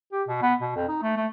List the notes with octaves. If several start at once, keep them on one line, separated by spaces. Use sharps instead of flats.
G4
B2
B3
B2
F2
D#4
A3
A3